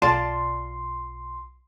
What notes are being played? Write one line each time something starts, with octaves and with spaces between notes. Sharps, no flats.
B1 F4 D5 A5 C6